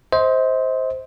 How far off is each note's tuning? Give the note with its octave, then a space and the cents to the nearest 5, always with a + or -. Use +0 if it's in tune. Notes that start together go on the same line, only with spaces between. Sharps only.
C5 +0 D#5 +40